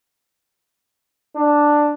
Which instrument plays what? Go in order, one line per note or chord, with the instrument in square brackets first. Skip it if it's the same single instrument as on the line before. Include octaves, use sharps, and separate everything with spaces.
[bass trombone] D4